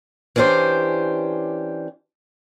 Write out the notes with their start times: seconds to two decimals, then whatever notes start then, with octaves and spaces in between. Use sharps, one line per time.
0.36 E3 C#4 D4 G4 C5